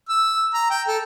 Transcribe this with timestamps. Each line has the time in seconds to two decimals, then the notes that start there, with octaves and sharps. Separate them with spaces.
0.09 E6
0.54 A#5
0.70 G5
0.88 A4